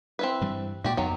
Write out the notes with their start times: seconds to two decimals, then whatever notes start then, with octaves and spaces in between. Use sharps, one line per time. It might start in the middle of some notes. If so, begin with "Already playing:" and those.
0.19 C4 E4 B4
0.41 G2 E3 G3
0.84 A#2 G#3 F#4 G4 D5
0.97 F2 D#3 F#3 B3